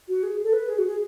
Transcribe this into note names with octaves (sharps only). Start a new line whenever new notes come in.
F#4
G#4
A4
B4
G#4
F#4
G#4